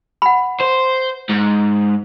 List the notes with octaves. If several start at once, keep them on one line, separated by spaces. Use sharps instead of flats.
F#5 B5
C5
G#2